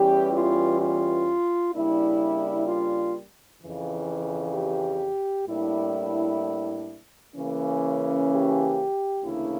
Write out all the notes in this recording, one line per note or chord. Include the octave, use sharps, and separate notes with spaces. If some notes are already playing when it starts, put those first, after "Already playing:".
Already playing: E2 E3 G3 C#4 G4
F4
F4
C#3 G3 A#3 D4 E4
F4
F2 C#3 E3
G4
A2 G3 A#3 D4 E4
C#3 E3 A#3 C#4
G4
D2 C#3 E3 A#3 D4 E4